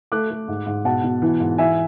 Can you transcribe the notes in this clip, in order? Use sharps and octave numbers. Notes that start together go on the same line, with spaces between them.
A3 D6 F#6
A3
G#2
G#2
B2 F#5 A5
B2
E3
G#2
E3 E5 G#5